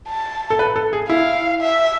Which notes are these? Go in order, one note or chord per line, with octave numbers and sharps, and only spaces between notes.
A5
A4
B4
A4
G#4
E4 F5
E5